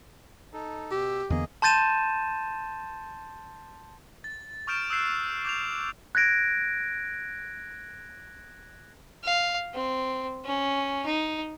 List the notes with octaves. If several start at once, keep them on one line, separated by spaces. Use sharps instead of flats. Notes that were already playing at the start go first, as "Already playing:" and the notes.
D#4 A4
B2 G4 E6
E2 D3 A#3 B3 G#4 D#5
A5 C6 G6 A6 D#7 E7
A6
C#6 D#6 F6 G6 D7 E7
D#6 E6 F#6 G6 C7 E7
D6 G6 F7
F#6 G#6 A#6 D7
F5
C4
C#4
D#4